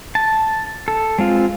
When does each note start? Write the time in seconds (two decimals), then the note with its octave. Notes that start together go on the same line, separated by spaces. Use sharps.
0.15 A5
0.88 A4
1.19 G#3 C4 F4